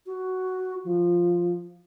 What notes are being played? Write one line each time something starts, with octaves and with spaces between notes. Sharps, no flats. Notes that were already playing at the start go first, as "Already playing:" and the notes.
F#4
F3